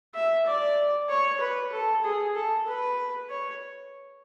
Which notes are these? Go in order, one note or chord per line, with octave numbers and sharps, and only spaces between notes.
E5
D5
C#5
B4
A4
G#4
A4
B4
C#5